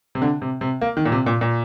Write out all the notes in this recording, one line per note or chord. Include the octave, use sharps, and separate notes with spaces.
C3
D3
C3
C3
A#3
D#3
A#2
C3
A#2
A#2